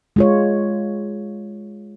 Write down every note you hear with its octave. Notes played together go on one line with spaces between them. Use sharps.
G#3 F4 C#5